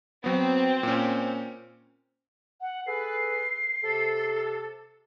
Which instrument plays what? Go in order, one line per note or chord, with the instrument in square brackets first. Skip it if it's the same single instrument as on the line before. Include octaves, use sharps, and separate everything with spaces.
[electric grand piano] F#3 B3 [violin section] C4
[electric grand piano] A#2 C#4
[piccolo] F#5
[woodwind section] G#4 A4 B4 [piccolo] C7
[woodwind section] C3 A4